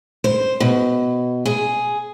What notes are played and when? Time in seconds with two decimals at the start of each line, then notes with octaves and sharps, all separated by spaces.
0.24 C5
0.60 B2
1.46 G#4